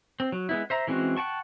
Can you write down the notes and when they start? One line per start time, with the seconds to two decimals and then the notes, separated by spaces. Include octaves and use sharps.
0.20 C4
0.32 F#3
0.49 G#3 B3 E4
0.70 C5 E5 A#5
0.87 E3 G#3 C4 C#4 F#4
1.17 F#5 G5 A5 C#6